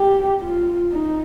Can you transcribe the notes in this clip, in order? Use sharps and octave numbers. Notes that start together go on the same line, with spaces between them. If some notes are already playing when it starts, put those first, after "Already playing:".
Already playing: G4
F4
D#4